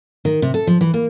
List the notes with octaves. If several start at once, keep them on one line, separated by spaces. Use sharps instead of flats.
D#3
C3
A4
F3
E3
A#3